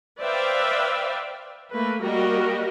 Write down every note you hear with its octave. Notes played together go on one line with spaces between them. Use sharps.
B4 C5 D5 E5 F5 G5
A3 A#3 B4
G3 A#3 F#4 G4 A#4 D#5